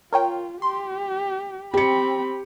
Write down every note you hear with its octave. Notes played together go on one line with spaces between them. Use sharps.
F4 A#4 C#5 G5
G4 C6
C4 G4 B5 C#7